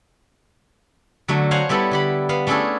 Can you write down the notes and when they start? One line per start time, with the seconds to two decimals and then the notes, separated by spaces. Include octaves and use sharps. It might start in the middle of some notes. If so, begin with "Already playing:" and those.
1.28 D3 F#3 A3
1.51 C5 C#5 F5 F#5 G#5 A#5
1.69 G3 B3 E4 A4
1.91 D3 G4 B5
2.29 B3 F5
2.47 A3 C#4 D4 E4 G#4 A4